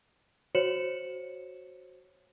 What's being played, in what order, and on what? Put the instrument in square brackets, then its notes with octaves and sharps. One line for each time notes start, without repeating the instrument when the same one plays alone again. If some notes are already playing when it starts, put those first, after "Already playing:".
[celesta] F#4 C5 C#5 C#7 E7 F#7